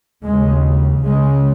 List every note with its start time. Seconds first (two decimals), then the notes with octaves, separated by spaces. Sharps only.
0.24 D#2 C#3 G#3
1.03 C#2 C#3 G#3